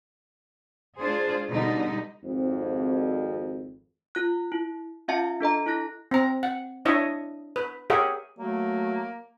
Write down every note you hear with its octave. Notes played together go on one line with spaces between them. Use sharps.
G#3 D4 F4 G#4 C5
B2 D3 G3 D#4
G#1 F2
F4 F#6
E4
C#4 F4 E5 F5 A5 C#7
D4 A4 D#5 A#5
E4 A4 F#6 A#6
C4 A#5
F#5
D4 E4 C#5 D#5 E5
B4
G4 G#4 A#4 C#5 E5 F#5
F#3 A3 A#3